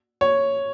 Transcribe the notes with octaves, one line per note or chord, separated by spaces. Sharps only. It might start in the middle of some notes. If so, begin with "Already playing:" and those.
C#5